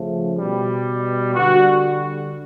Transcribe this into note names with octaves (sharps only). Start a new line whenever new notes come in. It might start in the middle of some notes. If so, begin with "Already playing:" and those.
Already playing: C#3 F3 A3
B2 G3
D3 G3 F#4